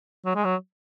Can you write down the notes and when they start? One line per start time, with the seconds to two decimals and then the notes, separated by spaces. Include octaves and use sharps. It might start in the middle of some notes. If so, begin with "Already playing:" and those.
0.25 F#3
0.35 G#3
0.45 F#3